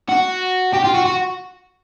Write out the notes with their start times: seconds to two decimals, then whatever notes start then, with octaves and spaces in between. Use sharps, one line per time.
0.09 F#4
0.73 G4
0.84 F4
0.94 F#4
1.06 F#4